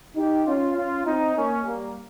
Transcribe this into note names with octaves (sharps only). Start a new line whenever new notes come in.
D#4 G4
C#4 F4
C#4 F4
C4 D#4
A#3 C#4
G3 A#3